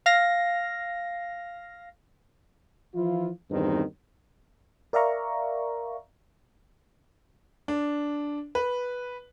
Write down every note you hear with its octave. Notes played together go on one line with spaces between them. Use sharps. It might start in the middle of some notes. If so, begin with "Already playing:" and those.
F5 A#6
E3 F3 E4 F4
E2 G2 B2 D#3 C4 D#4
A#4 D5 E5 F5 A#5 C#6
D4
B4